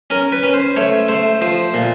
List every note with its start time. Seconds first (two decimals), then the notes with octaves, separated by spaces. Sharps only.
0.10 C#4 A#4
0.32 B4
0.43 C#4
0.54 C5
0.76 A3 C#5
1.09 A3 C5
1.41 F3 C5
1.74 A#2